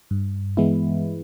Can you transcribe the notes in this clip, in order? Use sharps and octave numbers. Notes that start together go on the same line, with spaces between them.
G2
E3 G#3 B3 E4